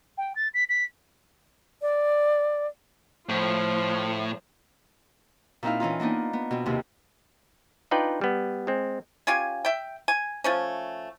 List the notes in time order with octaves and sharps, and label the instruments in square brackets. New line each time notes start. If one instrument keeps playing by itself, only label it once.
[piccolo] G5
A6
B6
B6
[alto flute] D5
[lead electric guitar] A2 [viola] F3 F4
[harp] A#2 C4 D#4 E4 F5
E3 C#4 D#4 F4
A#3 B3 D4 D#4
B3
B2 C4
D#2 C3
[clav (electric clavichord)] D4 D#4 F4 B4 D5 G5
G3 B3
G#3 C4
[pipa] C#4 F4 G4 G#5
E5 G5
G#5
F3 A3 C#4